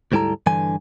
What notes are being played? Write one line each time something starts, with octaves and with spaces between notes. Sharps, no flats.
D2 G#2 G3 E4 A4 A#5
G2 D3 E3 G#5